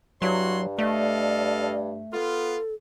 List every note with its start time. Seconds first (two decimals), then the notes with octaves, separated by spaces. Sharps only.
0.22 G2 F#3 E4 F#4 C#5 C6
0.79 A3 A4 D5 D#5 F5
2.13 B3 F4 A4